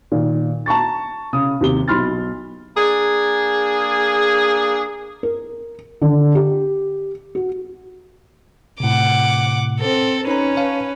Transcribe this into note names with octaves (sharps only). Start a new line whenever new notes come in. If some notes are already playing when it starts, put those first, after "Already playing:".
A#2 D#3
A5 A#5 C#6 A6
C#3 D#6
D#2 C3 G7
B1 B5 C6 F6 A6
A#3 D4 G#4
A#4
D3
G4
F#4
A2 C3 F#5 D6
C4 A4
C#4 D#4 B4 A#5
C#5 F5 A5